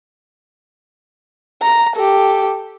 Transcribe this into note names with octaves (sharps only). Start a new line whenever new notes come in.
A#5
G4 A4